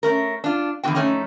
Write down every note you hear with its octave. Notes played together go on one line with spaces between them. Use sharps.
A3 C#4 A#4
D4 F4
E2 A#2 D3 B3 F#4 G5
F2 A3 C#4 D#4 A#5